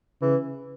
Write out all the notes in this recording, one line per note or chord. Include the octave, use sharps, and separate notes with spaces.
C#3 E3